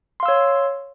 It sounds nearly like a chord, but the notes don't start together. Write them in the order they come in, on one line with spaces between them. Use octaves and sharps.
C6 F5 E6 C#5